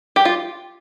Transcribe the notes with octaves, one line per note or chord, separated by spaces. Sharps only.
G4
F4